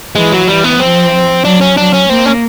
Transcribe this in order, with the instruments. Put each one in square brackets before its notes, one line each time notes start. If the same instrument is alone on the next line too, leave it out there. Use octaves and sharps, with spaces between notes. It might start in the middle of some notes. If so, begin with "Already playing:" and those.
[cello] E3 [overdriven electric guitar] G#3
[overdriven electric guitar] F#3
[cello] E3 [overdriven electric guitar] G3
[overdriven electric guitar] B3
[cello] F3 [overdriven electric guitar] C4
[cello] F#3 [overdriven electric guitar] D4
[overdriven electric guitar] C#4
[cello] F#3 [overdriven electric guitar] D4
[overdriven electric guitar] C#4
[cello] A#3 [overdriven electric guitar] C4
[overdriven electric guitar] C#4